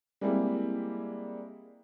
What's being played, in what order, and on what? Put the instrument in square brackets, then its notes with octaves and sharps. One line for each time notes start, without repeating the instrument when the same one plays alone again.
[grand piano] G3 G#3 A#3 C4 E4